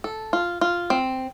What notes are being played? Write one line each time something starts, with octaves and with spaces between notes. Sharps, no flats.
A4
F4
F4
C4